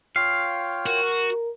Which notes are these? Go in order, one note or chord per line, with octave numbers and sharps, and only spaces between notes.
F4 C#5 F5 G5
F#4 A#4